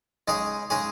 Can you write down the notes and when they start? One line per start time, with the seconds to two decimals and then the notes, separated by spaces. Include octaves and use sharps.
0.28 C#3 G#3 D#4 G#4 C#5
0.70 C#3 G#3 D#4 G#4 C#5